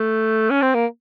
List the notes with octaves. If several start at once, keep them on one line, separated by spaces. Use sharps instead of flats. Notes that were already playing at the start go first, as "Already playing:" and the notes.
Already playing: A3
C#4
C4
A#3